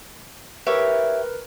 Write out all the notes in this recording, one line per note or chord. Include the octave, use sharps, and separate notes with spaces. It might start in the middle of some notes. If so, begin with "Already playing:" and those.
E4 G4 A#4 B4 C#5